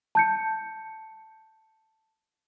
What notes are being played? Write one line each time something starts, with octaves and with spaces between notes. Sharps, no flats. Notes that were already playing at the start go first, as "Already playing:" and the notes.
A5 G6 C#7